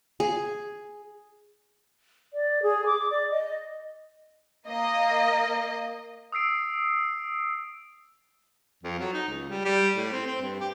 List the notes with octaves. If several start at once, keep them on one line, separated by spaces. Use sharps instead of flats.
G#4
D5
G#4
D6
D5
D#5
A#3 D#5
D#6 E6 C7 D7
F2
F#3
D#4
C#2
G3
G3
A2
C4
C4
G2
G4